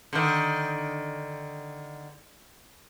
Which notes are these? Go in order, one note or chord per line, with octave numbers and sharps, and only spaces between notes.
D3 D#3